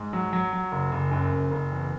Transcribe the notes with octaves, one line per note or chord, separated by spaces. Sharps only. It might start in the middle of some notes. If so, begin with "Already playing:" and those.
Already playing: G#2
F#3
F#3
F#3
F#1
F#1
F#2
F#1
F#1
E2